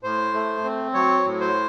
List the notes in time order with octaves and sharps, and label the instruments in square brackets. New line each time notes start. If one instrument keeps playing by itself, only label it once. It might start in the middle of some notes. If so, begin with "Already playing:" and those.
[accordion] A2 C5
A3
C4
F#3 C#5
A2
C5